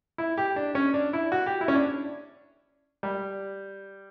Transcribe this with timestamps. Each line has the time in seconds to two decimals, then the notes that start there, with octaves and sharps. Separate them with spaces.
0.18 E4
0.38 G4
0.56 D4
0.75 C#4
0.94 D4
1.13 E4
1.32 F#4
1.46 G4
1.61 E4
1.68 C#4
1.75 D4
3.03 G3